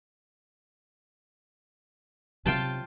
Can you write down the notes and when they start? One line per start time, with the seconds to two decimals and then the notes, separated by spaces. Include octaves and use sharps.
2.46 C3 F#3 F4 G5 A5